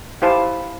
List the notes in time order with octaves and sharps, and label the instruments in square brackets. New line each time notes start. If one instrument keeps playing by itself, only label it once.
[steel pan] E4 G4 C5 F5 A5